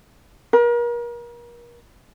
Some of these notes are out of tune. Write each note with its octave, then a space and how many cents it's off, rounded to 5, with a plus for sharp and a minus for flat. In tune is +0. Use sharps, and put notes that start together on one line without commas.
A#4 +35